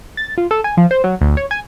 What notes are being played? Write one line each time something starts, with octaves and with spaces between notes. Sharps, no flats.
A6
F4
A4
G#5
F3
C5
F#3
D2
C#5
G#5